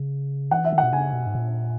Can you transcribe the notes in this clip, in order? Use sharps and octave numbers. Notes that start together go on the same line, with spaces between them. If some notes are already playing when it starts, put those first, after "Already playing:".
Already playing: C#3
E3 F#5
E5
D#3
F#5
B2
C#3 G#5
B2
G#2
A#2